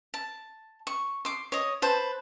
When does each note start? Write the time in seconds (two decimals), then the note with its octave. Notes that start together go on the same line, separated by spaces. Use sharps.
0.14 A5
0.87 C#6
1.25 C6 D6
1.52 C#5 D#5
1.82 B4 C5 A5